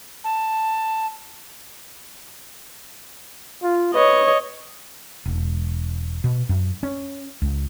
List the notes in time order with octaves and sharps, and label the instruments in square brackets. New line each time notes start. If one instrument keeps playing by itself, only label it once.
[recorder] A5
[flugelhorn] F4
[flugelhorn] B4 [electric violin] C#5 D#5
[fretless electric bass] E1
B2
F#2
C#4
C#2